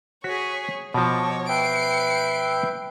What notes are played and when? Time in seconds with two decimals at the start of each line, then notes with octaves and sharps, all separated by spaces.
0.24 F#4 G#4 C#5 B6
0.94 B2 F3 C#5 D#5 A5 D6
1.49 B4 E5 G5 G6 C7 D7